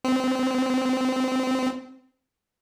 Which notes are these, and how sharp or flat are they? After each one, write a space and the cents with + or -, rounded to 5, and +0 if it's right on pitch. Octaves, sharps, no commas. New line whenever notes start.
C4 -20